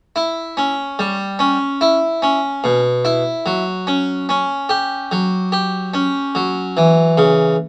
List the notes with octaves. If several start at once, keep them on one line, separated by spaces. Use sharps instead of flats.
E4
C#4
G3
C#4
E4
C#4
B2
E4
F#3
C#4
C#4
G4
F#3
G4
C#4
F#3
E3
C#3